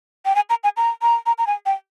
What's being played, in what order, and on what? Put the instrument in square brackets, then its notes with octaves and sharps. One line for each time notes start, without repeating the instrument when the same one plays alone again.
[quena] G5
G#5
A#5
G#5
A#5
A#5
A#5
A#5
G#5
G5